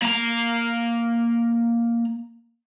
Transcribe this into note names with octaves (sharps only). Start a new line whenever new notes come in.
A#3 A#5